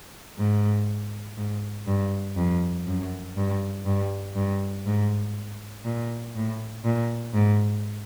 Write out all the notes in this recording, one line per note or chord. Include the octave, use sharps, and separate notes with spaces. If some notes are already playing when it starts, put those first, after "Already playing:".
G#2
G#2
G2
F2
F#2
G2
G2
G2
G#2
A#2
A2
A#2
G#2